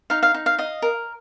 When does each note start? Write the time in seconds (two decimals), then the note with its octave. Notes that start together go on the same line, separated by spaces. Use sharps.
0.10 D#4 F5
0.23 F5
0.34 D#4
0.46 F5
0.58 D#5 F5
0.82 A#4